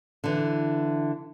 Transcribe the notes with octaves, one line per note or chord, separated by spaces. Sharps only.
D3 E3